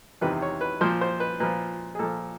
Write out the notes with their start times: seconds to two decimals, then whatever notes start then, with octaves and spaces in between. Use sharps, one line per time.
0.21 E2 C3 D#3 B4
0.42 C#5
0.61 B4
0.81 A#2 F3 C5
1.01 C5
1.20 B4
1.40 A#2 F3 B4
1.95 G#4
1.99 A#2 F3 A4